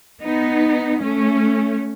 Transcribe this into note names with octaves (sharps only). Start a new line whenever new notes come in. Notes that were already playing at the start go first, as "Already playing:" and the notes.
B3 D#4
A3 C#4